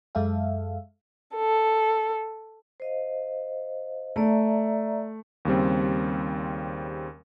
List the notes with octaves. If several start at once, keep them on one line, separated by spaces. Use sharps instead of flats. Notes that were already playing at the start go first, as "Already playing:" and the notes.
F#2 G#3 A4 E5 F5
A4
C5 D#5 F5
A3 D5 E5 A#5
D#2 C#3 G3 C4